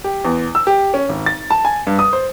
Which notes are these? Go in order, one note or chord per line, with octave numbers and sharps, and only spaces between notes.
G4
E2
E6
G4
C#4
G#1
A6
A5
G#5
G2
D#6
C5